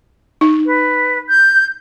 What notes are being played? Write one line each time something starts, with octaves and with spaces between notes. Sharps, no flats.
D#4
B4
G6